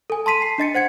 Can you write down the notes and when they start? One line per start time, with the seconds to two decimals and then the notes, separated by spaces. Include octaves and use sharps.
0.10 A4 G#5
0.26 A5 C6 B6 D#7
0.42 C7
0.58 D4 D#5 A6 C#7
0.74 C5 F#5 G#6 C#7